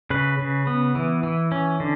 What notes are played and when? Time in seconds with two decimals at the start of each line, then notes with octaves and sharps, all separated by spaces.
0.10 C#3 B4
0.39 C#3
0.67 B3
0.95 E3
1.23 E3
1.52 C#4
1.80 D3